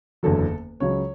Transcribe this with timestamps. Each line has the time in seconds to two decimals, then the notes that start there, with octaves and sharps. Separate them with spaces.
0.23 F#1 E2 D3 F#3 A4
0.80 C#2 C#3 F#3 C#5